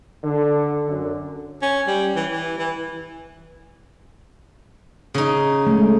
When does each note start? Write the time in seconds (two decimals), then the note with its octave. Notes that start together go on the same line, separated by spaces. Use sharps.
0.23 D3
0.87 F#2 D3
1.62 C#4
1.87 G3
2.16 E3
2.31 E3
2.59 E3
5.14 C#3 D#4
5.67 G#3 A3